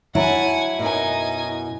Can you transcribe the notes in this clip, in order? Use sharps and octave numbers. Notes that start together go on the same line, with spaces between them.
F#3 E4 F#5 G#5 A5
F#2 B2 D#4 G#5